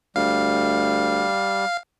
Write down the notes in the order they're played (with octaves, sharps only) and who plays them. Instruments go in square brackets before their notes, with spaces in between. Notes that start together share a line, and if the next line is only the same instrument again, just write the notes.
[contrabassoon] D2 [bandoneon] G3 [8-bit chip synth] F5